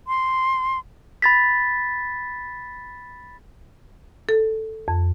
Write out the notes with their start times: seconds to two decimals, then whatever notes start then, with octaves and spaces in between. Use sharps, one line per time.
0.07 C6
1.22 B5 A6 B6
4.29 A4
4.88 F2